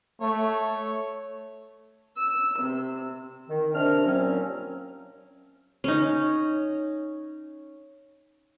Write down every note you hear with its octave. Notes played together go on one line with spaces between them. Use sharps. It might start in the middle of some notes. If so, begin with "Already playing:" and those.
A3 C#5
E6
C3
D#3
C3 D4 A#4 F6
D#2 A#2 F3 F#3 C4 C#4
C#4 D#4